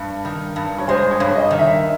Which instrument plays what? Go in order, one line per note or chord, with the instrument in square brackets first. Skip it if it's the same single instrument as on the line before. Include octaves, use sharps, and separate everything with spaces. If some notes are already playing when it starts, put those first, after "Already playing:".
Already playing: [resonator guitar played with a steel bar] G2
D#3
G2
[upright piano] C#5
[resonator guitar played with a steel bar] G#3 [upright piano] C5
[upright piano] C#5
[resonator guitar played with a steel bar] G2
[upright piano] D#5
[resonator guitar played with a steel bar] D#3
[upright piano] E5